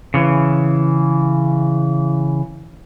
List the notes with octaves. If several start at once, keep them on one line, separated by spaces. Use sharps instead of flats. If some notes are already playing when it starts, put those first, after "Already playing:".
C#3 E3